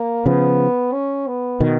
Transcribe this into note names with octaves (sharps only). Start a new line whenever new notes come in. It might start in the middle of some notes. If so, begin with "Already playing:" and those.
Already playing: A#3
C#3 F3 B3
C#4
B3
B2 D#3